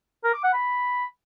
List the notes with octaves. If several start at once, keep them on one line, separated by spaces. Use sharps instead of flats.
A#4
D6
F#5
B5